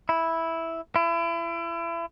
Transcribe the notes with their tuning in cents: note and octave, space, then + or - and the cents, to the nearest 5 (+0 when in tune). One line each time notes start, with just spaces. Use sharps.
E4 -5
E4 +35